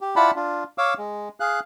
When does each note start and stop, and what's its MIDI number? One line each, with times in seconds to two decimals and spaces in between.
0.01 0.15 67
0.16 0.31 64
0.16 0.31 65
0.16 0.31 74
0.16 0.31 78
0.16 0.31 81
0.16 0.31 83
0.36 0.64 62
0.36 0.64 65
0.78 0.94 73
0.78 0.94 77
0.78 0.94 86
0.78 0.94 88
0.98 1.29 56
1.40 1.60 68
1.40 1.60 77
1.40 1.60 90